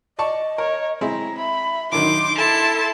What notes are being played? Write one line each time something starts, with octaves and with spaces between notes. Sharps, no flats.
D5 D#5 A5 C#6
A#4 C#5
G#3 C4 E4 A#5
E5 B5
D3 D#3 F#3 D#4 C6 D6
E4 A4 A5